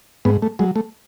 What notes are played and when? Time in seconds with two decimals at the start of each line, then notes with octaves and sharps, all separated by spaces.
0.25 G#2 B3
0.42 A3
0.59 F#3 G#3
0.76 A3